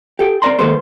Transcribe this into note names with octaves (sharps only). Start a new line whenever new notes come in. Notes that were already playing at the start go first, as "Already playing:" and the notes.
G4 A4 G5
C4 A#4 D5 A#5 C6
D#3 G#3 A#3 A4 B4 C5